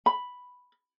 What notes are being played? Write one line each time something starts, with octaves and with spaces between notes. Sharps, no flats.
B5